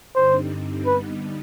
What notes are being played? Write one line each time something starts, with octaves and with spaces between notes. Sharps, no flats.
G2 D3 G3 C4 D#4 C5
D3 G3 B3 D#4 B4